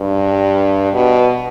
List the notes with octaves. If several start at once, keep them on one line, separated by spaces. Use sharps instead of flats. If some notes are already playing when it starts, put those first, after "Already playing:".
Already playing: G2
B2